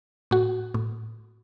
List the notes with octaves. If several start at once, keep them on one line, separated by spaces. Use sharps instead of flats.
A2 F#4
A2